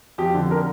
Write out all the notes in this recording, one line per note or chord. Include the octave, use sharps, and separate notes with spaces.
F2 G4
D3
A#4